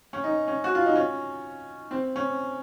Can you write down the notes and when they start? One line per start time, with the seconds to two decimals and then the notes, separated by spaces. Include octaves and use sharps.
0.13 C#4
0.24 D#4
0.48 C#4
0.64 F#4
0.75 F4
0.86 D#4
0.95 C#4
1.91 C4
2.16 C#4